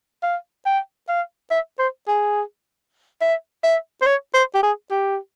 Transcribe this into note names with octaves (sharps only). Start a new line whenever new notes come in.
F5
G5
F5
E5
C5
G#4
E5
E5
C5
C#5
C5
G4
G#4
G4